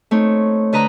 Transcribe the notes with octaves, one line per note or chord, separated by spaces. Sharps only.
A3 C4 D#4 C#5
D3 B4 D#5 A#5 B5